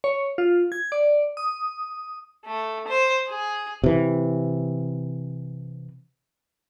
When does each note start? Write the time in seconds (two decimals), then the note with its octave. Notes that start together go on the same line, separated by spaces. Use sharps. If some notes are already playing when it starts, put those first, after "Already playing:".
0.04 C#5
0.38 F4
0.72 G#6
0.92 D5
1.37 D#6
2.47 A3
2.89 C5
3.29 G#4
3.84 C3 E3